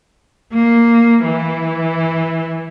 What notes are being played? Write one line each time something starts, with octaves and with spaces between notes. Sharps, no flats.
A#3
E3